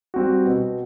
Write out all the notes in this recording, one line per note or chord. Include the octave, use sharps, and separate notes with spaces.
G3 C4 F#4
B2